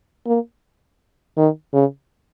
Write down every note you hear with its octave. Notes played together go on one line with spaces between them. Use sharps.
A#3
D#3
C#3